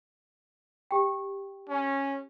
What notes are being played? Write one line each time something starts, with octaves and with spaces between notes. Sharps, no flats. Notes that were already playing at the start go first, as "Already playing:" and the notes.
G4 G5
C#4